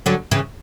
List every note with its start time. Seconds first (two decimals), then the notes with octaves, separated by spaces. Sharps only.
0.06 D3 F#3
0.31 C#3 E3